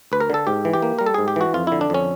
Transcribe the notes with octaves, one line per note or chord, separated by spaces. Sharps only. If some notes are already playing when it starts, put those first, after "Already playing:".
D2 B4
A#4
D3 A4
G#2 G4
E3
G4
A#3
G3 A#4
A4
G#2 G#4
G4
E3 F#4
F2 F4
D3 E4
D4
F2 C#4